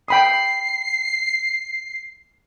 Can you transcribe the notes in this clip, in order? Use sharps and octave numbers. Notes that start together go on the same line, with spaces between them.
G5 B5 D#6 C7